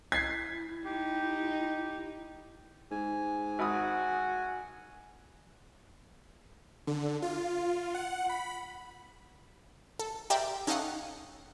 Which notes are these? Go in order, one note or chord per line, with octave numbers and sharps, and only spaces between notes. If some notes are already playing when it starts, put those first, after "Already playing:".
E4 G#6 B6 C7
D#4 G4
G#2 G#5
G#1 F#4 B5 D#6
D3
F4
F#5
B5
A4
G4 A#4 C5 D5 E5 G5
C#4 D#4 A4 D#5 F5 F#5